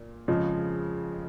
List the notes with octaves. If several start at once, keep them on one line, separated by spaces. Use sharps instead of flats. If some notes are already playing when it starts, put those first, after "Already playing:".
Already playing: A#2
F2 C#3 F3 G#3